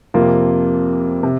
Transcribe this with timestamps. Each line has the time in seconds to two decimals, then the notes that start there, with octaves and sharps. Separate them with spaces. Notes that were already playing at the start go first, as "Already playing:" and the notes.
0.14 F2 C3 F3 A#3 F4
1.23 C3